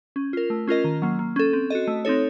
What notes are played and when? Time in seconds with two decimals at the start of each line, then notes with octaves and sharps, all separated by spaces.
0.16 C#4
0.33 F4 A#4
0.50 A3
0.67 C#4 F4 A#4 D#5
0.84 D#3
1.02 F#3 A#3
1.19 A#3
1.36 C#4 A4
1.53 C4
1.70 F#4 A4 D#5
1.88 A3
2.05 C4 D#4 A4 C#5